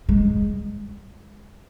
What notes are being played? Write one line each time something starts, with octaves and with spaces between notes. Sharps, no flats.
G#3